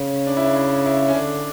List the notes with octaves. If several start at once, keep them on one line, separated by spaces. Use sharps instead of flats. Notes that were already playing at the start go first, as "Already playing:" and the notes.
Already playing: C#3 C#4
D4
E4
D4
E4
E4
C#4
D3 D4